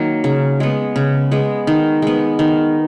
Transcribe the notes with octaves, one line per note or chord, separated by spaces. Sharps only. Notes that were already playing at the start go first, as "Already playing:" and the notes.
Already playing: D#3 F#3 A#3
C#3
G#3 B3
C#3
G#3 B3
D#3
G#3 B3
D#3